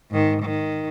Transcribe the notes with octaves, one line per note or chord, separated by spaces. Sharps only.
G#2 D#3
D#3